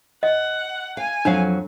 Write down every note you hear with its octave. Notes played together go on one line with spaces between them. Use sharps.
D#5 F#5
F5 G#5
F2 F#3 D4 F5